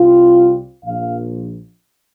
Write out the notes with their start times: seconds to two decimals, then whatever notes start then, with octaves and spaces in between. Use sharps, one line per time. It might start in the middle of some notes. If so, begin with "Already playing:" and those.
Already playing: C2 C3 G3 C4 F4
0.83 A#1 A#2 F3 F5